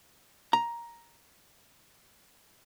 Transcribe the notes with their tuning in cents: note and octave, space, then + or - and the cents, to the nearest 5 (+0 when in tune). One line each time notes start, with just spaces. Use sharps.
A#5 +10